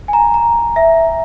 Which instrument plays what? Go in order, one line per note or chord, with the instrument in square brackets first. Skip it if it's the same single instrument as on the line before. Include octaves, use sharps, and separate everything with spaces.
[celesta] G#5
A#5
A#5
E5